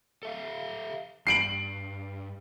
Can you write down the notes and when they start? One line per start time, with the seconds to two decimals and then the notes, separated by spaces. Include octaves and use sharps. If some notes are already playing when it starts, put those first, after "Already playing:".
0.23 A4 E5 F5
1.27 G2 C7 D7 F#7